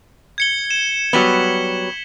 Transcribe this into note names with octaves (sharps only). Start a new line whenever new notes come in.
G#6 C#7 G7
E7
F#3 G3 B3 B6 F#7 G7